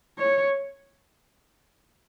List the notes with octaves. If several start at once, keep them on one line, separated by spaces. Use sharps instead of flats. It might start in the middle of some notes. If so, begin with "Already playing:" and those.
C#5